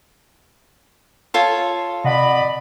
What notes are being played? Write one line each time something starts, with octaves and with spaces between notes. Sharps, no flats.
F4 A4 C#5
C3 D5 D#5 F#5 B5